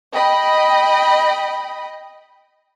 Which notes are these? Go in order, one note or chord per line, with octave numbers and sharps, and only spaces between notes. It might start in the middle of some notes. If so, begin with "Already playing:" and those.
D#5 G5 B5